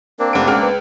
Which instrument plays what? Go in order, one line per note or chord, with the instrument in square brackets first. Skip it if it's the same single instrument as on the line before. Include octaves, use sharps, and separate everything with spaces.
[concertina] A#3 C4 D4 [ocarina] A#4
[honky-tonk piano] F1 D7 [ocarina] F#5
[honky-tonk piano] C#2 F6 [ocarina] F#5
[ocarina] B4